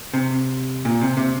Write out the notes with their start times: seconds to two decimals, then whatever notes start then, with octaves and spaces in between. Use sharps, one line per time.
0.14 C3
0.85 A#2
1.01 C3
1.17 C3